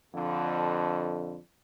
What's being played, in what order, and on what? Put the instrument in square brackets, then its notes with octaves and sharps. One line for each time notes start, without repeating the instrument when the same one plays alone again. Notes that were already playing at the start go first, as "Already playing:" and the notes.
[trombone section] F2 D3